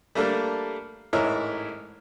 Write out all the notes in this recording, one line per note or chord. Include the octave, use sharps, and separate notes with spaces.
G3 A3 A#3 D4 A4 A#4
A1 G#2 E4 A#4 C#5